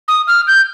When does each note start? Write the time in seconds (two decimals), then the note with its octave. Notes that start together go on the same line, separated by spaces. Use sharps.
0.08 D#6
0.27 F6
0.47 G6